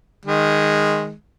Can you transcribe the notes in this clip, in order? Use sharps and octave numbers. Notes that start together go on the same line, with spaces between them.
D#3 G#3